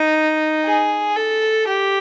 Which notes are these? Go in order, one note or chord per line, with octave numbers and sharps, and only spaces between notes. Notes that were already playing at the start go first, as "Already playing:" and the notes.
Already playing: D#4
G#4
A4
G4